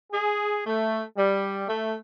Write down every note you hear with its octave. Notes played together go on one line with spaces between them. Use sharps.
G#4
A3
G3
A3